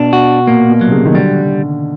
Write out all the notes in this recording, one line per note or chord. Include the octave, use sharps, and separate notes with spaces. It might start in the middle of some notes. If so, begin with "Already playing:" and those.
Already playing: B2 D4
F#4
A#2 A#3
B2
F#3
C3
C#3
D#3
D3 G3